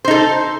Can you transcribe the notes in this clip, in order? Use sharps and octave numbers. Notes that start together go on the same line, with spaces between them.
D#4 A4 C5